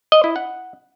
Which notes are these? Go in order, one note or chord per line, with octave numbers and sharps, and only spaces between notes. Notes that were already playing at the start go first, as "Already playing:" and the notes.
D#5
E4
F#5